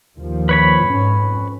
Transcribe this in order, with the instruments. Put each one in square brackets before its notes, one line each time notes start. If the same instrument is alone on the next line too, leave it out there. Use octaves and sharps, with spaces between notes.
[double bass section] D#2 F3
[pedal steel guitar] B4 C#5 B5
[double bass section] F2 G#2 C#4